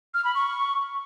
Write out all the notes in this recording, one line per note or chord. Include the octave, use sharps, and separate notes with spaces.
F6
B5
C#6